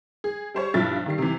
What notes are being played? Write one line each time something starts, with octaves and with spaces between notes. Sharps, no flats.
G#4
G3 C5 C#5
B1 G2 F3 E4 F4 A6
D#3 G3 C7
C3 E3